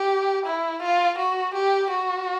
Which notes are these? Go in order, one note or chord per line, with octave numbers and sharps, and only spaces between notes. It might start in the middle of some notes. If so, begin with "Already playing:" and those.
Already playing: G4
E4
F4
F#4
G4
F#4